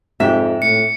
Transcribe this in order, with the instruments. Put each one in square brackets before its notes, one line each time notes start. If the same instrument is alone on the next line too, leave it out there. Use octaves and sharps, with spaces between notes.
[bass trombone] F2 [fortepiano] G#2 C3 G4 [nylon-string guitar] E5
[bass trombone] A2 [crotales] C#7